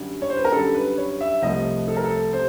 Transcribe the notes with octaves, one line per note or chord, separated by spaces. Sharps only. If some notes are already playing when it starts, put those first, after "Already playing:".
Already playing: F#2 D3 G3
C#5
C5
B4
A#4
F#2 D3 G3 A4
B4
C#5
E5
C2 C3 F3 A3 D#5
A4
A#4
A4
C3 C5